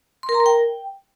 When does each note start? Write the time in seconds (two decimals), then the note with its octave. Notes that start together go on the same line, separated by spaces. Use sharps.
0.23 C6
0.29 A#4
0.34 A#5
0.40 A#4
0.46 G5